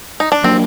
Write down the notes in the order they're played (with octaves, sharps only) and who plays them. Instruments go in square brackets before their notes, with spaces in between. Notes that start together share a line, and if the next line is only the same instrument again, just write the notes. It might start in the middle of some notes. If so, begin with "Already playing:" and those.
[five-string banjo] D#4
D4
[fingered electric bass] F#3 A#3 D4 [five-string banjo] C4